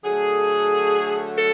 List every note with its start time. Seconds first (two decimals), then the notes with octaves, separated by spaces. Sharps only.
0.03 D3 F#3 A3 G#4
1.38 A4